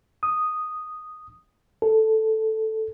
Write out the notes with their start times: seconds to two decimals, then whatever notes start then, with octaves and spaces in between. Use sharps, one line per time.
0.23 D#6
1.82 A4